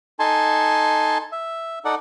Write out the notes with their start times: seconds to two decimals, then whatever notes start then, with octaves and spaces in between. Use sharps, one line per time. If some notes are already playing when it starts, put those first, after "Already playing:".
0.19 D#4 A4 G#5 A5 C6
1.32 E5
1.85 D#4 A4 D5 F#5